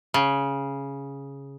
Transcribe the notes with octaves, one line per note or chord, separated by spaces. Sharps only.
C#3